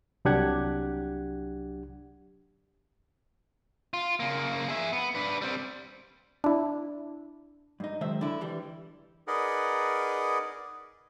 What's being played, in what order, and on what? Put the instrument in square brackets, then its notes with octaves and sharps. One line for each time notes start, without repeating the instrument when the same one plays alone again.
[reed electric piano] C2 F#3 D4 G4 F#5 G#6
[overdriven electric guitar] F4
C#3 A#3
G#4 E5
B3
D4 B4
G3 C4
[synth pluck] D4 E4
[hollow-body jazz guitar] G2 D#4
F#2 D#3 G#3 C5 E5
D3 D4 E4
E3 G3
[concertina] D#4 G#4 A#4 B4 D5 F#5